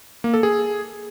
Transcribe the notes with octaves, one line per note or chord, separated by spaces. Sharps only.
A#3
A4
G#4